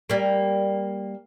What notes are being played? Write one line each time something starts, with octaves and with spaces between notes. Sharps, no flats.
G3 A#3